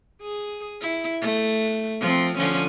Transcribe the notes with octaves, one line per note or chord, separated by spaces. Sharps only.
G#4
E4
A3
F3 C4
D3 F3 C#4